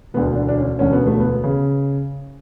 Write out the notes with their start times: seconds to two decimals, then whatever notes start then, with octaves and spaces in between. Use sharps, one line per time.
0.14 E1 D2 D3 B3
0.35 D4
0.48 D4
0.58 C#4
0.79 E1 D2 D3 C#4
0.93 B3
1.06 A3
1.20 B3
1.44 C#3